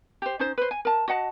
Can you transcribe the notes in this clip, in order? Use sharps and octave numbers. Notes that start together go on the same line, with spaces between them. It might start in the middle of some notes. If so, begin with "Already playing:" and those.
G4 C5
C#4 D#4 C5
B4 C5
G#5
A#4 A5
F#4 D#5 F#5 A5